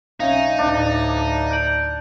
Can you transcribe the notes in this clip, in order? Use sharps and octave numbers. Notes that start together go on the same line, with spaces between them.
B1 C#4 D#4 E5 F5
D2 A2 D4
G6 D7 F#7